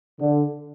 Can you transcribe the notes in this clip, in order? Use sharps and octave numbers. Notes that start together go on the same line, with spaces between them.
D3